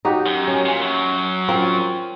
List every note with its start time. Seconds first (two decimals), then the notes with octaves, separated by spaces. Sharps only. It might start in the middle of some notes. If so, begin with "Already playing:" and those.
0.05 D#4 F#4 G4
0.26 F#2
0.48 C#4
0.65 A#2
0.82 F#2 F#3
1.48 C4 F4 A#4